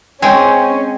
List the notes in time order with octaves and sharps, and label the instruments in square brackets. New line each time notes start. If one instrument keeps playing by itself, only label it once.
[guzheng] G#3 C4 [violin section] C#4 [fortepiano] G5 G#5